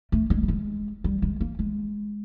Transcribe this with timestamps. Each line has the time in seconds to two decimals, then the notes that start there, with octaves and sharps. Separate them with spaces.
0.12 A3
0.30 G#3
0.43 G3
0.48 G#3
1.04 G3
1.22 G#3
1.41 A#3
1.59 G#3